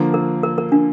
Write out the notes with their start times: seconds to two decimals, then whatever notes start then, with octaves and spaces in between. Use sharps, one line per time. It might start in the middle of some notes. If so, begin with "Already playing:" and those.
Already playing: D3 F3 A#3
0.14 A#4
0.43 A#4
0.58 A#4
0.72 D4